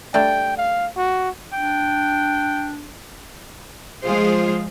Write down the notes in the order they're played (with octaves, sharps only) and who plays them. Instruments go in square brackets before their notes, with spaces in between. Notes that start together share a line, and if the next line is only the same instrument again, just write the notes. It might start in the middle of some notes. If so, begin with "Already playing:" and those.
[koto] G3 A3 D4 [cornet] G5
[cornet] F5
F#4
[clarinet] D4 [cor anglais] G5
[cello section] F3 G#3 F4 G#4 C5